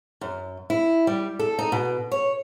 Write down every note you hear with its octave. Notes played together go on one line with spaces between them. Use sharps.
F#2
E4
G3
A4
D#4
B2
C#5